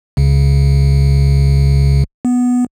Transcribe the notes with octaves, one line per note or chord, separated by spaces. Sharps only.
C#2 C#3
B3